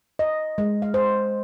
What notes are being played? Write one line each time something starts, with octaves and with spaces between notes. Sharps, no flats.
D#5
G#3
F5
C5